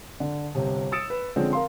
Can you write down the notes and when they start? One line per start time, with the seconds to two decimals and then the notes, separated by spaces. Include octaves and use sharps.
0.20 D3
0.55 G1 C3
0.92 D#6 E6 A6 C#7 D7 E7
1.10 B4
1.36 D3 F3 G#3 C4 C#4
1.53 A#4 F5 C6